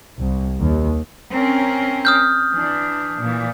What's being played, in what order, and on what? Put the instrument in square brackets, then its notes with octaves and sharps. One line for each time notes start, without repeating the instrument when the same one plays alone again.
[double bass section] C2
D#2
[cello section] C4 C#4 A#4
[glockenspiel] D#6 F6 G6
[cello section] E3 D4
A#2 E3